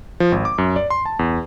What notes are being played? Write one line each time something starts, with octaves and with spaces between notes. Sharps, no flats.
F3
G#1
D6
F#2
D5
C6
A5
E2